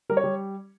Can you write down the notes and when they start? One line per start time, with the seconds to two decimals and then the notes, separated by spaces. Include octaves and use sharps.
0.09 G3 A#4
0.17 C#5
0.24 G3